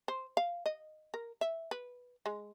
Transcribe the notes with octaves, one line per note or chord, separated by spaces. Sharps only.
C5
F5
D#5
A#4
E5
B4
G#3